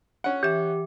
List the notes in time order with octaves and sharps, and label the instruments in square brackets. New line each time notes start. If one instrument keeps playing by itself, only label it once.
[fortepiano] C#4 F#5
[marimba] E3 E5 [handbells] G4